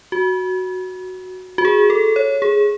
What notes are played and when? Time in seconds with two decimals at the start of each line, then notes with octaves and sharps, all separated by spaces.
0.12 F#4
1.58 F#4
1.65 G#4
1.90 A4
2.16 C#5
2.42 G#4